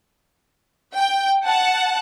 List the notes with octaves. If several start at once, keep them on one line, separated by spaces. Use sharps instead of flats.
G5
F#5 A5